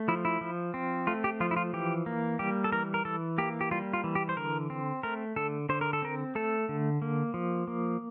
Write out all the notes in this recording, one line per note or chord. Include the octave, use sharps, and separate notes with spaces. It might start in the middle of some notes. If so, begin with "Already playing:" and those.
Already playing: A3
F3 E4
E4
F3
C4
A3 F4
G4
F3 F4
E4
F4
E3 G4
A#3
G3 G4
A4
E3 A#4
A#4
E3 A4
A#3 G4
G4
G3 F4
F4
E3
G4
C5
D3 A#4
C4
A3 A#4
D3 A4
D3 C5
A#4
A4
C4 A#4
A3 A4
D3
A#3
F3
A#3